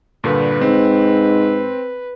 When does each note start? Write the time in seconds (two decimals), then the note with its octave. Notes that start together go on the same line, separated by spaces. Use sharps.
0.24 G2 A#2 D3 B4
0.61 G#2 C4